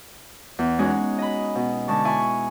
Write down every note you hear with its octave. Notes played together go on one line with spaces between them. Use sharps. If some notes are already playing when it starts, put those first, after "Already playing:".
E2
G#3 C#4 D#4 F#4 G#4
D#5 B5
B2
D3 G#3 A5 C#6
E4 G#5 C#6